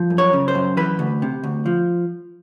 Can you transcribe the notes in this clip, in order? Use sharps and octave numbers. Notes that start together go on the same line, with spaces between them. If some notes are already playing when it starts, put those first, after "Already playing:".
Already playing: F3
F#2
C#5
C#3
C5
F#2
E3 B4
D2
C3
D2
F3